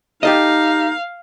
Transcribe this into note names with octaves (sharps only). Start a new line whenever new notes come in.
D#4 G4 A4 D#5 F5